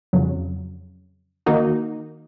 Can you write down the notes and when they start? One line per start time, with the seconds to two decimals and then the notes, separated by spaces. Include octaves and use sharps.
0.13 F2 C#3 F#3
1.46 D#3 A#3 D#4 F#4